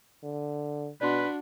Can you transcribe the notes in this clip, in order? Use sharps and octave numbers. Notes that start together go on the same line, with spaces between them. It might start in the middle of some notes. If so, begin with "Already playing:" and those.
D3
B2 D4 F#4 B4 D5 C6